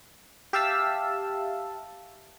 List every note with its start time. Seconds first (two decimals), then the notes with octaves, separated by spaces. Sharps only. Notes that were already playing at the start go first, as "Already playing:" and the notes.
0.53 G4 E5 F5 A5 E6